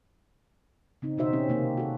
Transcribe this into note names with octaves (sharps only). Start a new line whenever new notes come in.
C#3 C4 D#4
B2 D#3 D#4 F#4 C5 E5
C4 C#4 G4
C3 A#3 C4
F#4 A4